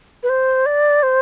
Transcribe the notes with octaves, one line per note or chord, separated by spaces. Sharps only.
B4
C5
D5
C5